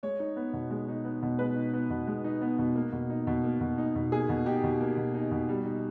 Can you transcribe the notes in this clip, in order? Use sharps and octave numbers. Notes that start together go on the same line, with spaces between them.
G#3 C#5
D#4
B3
B2
G#3
D#4
B3
B2
G#3 B4
D#4
B3
B2
G#3
D#4
B3
B2
A#3
B2
D#4
B2
A#3
B2
D#4
B2
A#3 G#4
B2
D#4 G4
B2
A#3
B2
D#4
B2
G3
D#4